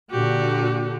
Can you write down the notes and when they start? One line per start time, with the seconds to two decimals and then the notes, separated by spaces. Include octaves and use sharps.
0.10 A#2 D3 F#4 G4